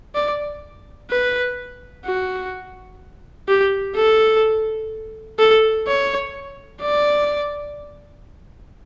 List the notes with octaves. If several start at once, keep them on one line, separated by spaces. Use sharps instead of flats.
D5
B4
F#4
G4
A4
A4
C#5
D5